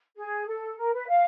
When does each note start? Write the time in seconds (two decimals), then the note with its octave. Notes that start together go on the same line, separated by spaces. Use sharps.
0.16 G#4
0.47 A4
0.78 A#4
0.94 B4
1.08 F5